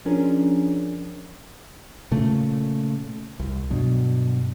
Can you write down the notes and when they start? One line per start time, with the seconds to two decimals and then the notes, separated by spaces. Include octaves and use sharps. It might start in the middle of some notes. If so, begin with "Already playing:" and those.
0.05 F3 C#4 D4 G#4 A#4
2.11 A#2 C#3 A3
3.39 C2
3.70 G2 B2 F#3